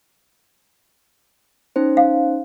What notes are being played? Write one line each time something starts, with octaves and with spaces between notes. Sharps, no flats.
C#4 D#4 C5
F5